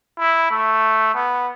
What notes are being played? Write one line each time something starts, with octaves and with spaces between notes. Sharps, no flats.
E4
A3
B3